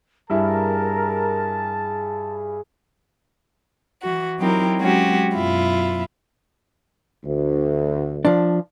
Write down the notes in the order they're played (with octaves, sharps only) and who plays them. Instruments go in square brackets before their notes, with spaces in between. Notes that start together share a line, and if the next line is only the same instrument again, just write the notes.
[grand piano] G2 E4 [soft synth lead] G#4 [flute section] A#4 [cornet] A5
[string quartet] E3 F#4
F#3 C4 D#4 E4 G4 A#4
F#3 G#3 C4 C#4 F#4 G4
F#2 B2 E4 F4
[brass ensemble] D2
[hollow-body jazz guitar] F3 D4